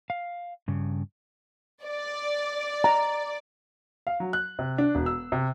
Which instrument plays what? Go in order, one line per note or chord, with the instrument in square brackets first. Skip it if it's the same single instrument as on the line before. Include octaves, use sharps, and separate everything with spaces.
[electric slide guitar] F5
G2 C#3
[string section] D5
[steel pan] A#5
[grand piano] F5
F#3
F#6
C3
D4
E1
E6
C3